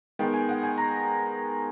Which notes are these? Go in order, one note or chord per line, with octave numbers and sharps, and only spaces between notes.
D#3 G#3 B3 G5
G#5
F#5
G#5
A#5